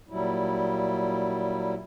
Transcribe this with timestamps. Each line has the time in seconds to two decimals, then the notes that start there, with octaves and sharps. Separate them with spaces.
0.09 A#2 F#3 G3 E4